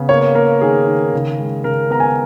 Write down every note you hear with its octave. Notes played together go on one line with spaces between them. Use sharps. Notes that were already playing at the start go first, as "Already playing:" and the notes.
Already playing: C#3 B3
A#3 C#5
A#3 A#4
D#3 G#4
D#3
C#3
G#3
C#3 A#4
B3 A#5
G#5